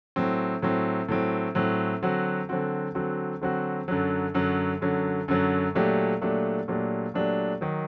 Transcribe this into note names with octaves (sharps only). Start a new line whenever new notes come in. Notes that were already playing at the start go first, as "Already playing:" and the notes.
A2 F#3 C4
A2 F#3 C4
A2 F#3 C4
A2 F#3 C4
D3 F#3 C4 F#4
D3 F#3 C4 F#4
D3 F#3 C4 F#4
D3 F#3 C4 F#4
F#2 D3 F#3
F#2 D3 F#3
F#2 D3 F#3
F#2 D3 F#3
A#2 F#3 A3 D4 G4
A#2 F#3 A3 D4 G4
A#2 F#3 A3 D4 G4
A#2 F#3 A3 D4 G4
D#3 F#3